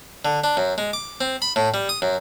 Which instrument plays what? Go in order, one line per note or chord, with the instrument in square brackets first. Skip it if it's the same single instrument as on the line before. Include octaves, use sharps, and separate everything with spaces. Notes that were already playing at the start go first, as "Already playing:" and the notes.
[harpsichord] D3
D4
F#2
G#3
D6
C4
B5
A2
G3
D#6
F#2